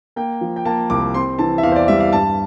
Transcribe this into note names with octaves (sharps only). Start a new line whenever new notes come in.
A#3 G5
F3
G5
A#3 A5
C2 D6
C4 C6
E3 A5
E5
E2 F5
C5
D5
G3 E5
F5
G2 A5